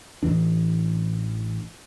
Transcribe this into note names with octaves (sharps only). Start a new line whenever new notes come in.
A1 C#3 E3 D4